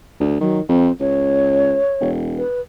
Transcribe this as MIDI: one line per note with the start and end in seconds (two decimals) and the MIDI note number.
0.20 0.37 38
0.41 0.61 51
0.41 0.61 54
0.69 0.90 41
0.69 0.92 60
1.00 1.79 37
1.00 2.09 73
2.01 2.42 28
2.38 2.61 71